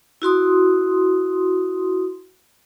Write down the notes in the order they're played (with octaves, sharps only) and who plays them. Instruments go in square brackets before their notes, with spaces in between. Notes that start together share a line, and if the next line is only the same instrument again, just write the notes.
[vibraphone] E4 F#4 C6 D#6